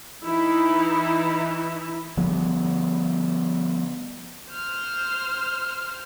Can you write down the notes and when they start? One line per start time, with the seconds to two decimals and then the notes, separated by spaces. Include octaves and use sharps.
0.22 E3 D#4 E4
2.17 D3 F3 G3 B3
4.52 C5 F6